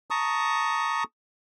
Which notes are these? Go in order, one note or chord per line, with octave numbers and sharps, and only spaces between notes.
A5 A#5 C#6 D#6